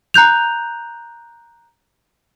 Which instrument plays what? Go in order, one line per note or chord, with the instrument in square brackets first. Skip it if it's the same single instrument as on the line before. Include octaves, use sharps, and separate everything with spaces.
[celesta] A#5 F#6 G6 F7